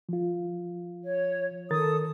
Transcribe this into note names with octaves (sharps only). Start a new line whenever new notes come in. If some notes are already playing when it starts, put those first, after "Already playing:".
F3 F4
C#5
D#3 A4 A#4 D#6 A6